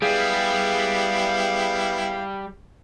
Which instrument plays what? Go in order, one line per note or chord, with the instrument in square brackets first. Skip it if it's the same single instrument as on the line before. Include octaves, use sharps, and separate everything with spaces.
[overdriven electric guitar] G3 [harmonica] B3 E4 G4 [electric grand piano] G#4 [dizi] F5